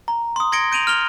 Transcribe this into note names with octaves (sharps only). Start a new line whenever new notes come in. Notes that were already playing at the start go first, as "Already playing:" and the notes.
A#5
C6 D#6
C6 G#6 A#6 C#7 D7 G7
G6 D7 D#7 F7 F#7
F6 F7 G7